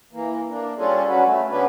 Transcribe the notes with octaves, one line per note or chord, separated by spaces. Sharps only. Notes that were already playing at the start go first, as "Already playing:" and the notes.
E3 A#3
A#3 D4
G3 C#4 D4 F4 G#4 A4
F#3 C#4 F#4 B4
A3
C#3 B3 C#4 D4 B4